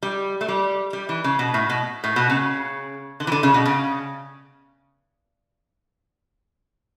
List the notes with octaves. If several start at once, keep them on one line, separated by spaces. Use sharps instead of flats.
G3
A3
G3
G3
E3
C#3
B2
A2
B2
A2
B2
C#3
D3
E3
D3
C#3
B2
C#3